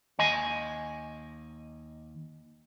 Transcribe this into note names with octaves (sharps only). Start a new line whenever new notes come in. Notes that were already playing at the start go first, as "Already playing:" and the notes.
D#2 D#5 G#5